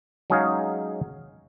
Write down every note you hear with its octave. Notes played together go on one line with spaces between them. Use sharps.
F#3 G#3 C#4 D#4 G#4 F5